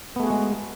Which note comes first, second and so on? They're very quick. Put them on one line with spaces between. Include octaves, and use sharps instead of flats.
B3 A3 G#4 F#4 G#3